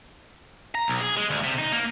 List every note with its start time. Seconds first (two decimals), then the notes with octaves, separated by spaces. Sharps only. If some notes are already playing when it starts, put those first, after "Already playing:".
0.75 A#5
0.88 B1
1.00 G#4
1.17 G#3
1.30 D2
1.44 C3
1.58 D#4
1.72 A#3